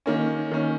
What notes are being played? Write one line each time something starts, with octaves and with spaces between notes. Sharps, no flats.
D#3 A#3 C#4
D#3 A#3 C#4